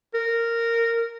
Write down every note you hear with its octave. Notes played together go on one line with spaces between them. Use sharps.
A#4